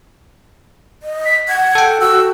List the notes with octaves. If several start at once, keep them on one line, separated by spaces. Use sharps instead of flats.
D#5
B6
F#5 G#6
A4 G5
F#4 E6